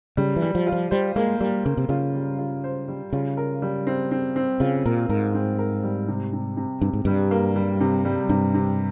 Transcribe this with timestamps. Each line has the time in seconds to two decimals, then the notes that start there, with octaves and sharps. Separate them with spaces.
0.17 C#3 G3
0.36 E3
0.42 G3
0.55 F3
0.67 F4
0.72 F3
0.91 G3 C5
1.16 G#3 A#3
1.41 G3 A#3
1.65 C#3 A#3
1.77 C3
1.89 C#3 F4
2.15 G3
2.39 F4
2.64 C5
2.88 G3
3.13 C#3 F4
3.37 A#4
3.62 G3
3.87 C4
4.11 C4
4.36 C4
4.60 C#3 F4
4.85 A#2 A#4
5.09 G#2 A#4
5.34 C4
5.59 A#4
5.84 G3
6.08 C3
6.33 C3
6.57 C3
6.81 G2 C3
6.93 G#2
7.05 G2 G3
7.31 A#3
7.56 G3
7.81 C3
8.05 G3
8.29 G2 C3
8.54 C3